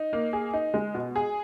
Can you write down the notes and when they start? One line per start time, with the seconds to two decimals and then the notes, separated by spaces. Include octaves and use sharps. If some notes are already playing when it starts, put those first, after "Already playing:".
Already playing: D#4
0.13 A#3
0.33 G#4
0.53 D#4
0.74 G#3
0.94 B2
1.16 G#4